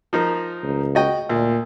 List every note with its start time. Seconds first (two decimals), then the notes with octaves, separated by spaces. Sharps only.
0.13 F3 D#4 A#4
0.63 C#2
0.95 F#4 D#5 G5
1.29 D2 A#2